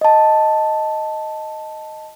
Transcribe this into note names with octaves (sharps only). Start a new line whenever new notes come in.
D#5 A5